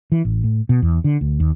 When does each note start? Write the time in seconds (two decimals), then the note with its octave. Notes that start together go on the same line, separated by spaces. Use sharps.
0.12 E3
0.25 A1
0.44 A2
0.69 B2
0.82 E2
1.04 D3
1.21 D2
1.40 D#2